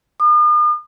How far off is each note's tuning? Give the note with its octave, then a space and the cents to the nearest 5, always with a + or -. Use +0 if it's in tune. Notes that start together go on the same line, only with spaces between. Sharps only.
D#6 -45